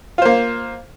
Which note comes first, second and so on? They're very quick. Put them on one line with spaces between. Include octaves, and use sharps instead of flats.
F4 C5 A#3